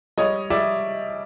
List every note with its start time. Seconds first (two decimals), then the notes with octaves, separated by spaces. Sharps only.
0.17 G3 C#5 D#5
0.50 G3 D5 E5